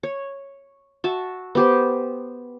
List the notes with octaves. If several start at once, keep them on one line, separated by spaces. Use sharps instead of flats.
C#5
F#4 E5 A5
B3 G4 C5